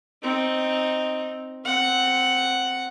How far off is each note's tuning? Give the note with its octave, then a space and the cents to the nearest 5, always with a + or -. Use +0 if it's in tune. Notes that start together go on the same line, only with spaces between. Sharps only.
C4 +0 D#4 +0
C4 +0 F#5 +0